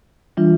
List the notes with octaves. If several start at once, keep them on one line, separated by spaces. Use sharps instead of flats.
E3 G3 D4 F4